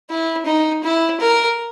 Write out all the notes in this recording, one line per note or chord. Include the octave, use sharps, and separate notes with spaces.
E4
D#4
E4
A#4